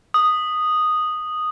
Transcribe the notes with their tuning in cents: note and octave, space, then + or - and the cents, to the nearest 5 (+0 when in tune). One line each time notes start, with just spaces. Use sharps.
D#6 -5